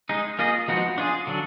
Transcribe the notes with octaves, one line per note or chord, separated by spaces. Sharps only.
G#3 D#4 G#4
A#3 F4 G#4 D#5
F3 G#3 B3 D#4 F#4
D4 F4 G#4
D3 F#3 D4